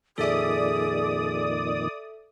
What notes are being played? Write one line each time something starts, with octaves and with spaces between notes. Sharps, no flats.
F2 A#2 D#3 G#4 A4 D5 E5 D#6